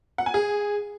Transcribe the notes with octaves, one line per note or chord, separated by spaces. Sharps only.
F#5
G#5
G#4